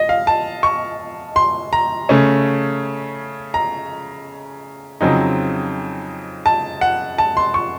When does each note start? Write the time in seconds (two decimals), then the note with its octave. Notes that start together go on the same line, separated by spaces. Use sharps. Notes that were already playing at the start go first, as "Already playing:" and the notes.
Already playing: D#5
0.09 F5
0.27 A5
0.63 C#6
1.36 C6
1.73 A#5
2.09 C#3 A3 C#4
3.54 A#5
5.01 F2 C#3 F#3 C4 D#4
6.46 A5
6.81 F#5
7.18 A5
7.37 C6
7.54 C#6